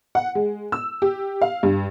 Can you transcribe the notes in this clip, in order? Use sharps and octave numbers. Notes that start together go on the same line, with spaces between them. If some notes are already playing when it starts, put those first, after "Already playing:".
F#5
G#3
E6
G4
F5
G2